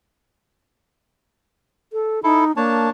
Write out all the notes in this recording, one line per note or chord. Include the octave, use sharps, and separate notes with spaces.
A4
D#4 E4 A4
A#3 D4 C#5 A5